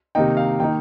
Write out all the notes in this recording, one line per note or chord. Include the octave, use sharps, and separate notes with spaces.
C3 D#3 A#3 D#4 G5
F5
D#3 A#3 D#4 G5